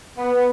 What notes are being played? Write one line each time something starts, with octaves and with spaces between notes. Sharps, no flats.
B3